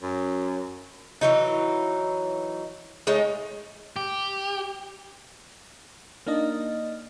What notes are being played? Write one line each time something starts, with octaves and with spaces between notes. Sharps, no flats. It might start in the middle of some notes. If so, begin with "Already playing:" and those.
F#2
E3 F#3 D#4
G#3 A3 D#4 C#5
G4
A#3 D4 D#4 D#5